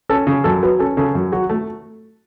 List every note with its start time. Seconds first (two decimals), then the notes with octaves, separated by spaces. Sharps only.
0.09 C#4 A4
0.27 C#3
0.44 F#2 A4
0.63 F#3 B4
0.79 C#4 A4
0.97 C#3 A4
1.15 F#2
1.32 F#3 F#4
1.49 A3